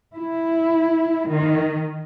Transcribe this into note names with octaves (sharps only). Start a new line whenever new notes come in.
E4
D#3